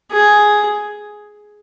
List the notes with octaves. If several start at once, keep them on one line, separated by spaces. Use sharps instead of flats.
G#4